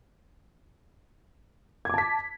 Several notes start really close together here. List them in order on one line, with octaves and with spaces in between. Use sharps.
G#6 D6 A5 B6